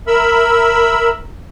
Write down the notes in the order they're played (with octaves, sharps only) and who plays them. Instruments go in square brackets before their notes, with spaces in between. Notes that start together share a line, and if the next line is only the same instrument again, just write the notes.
[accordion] A#4 E5 B5 E6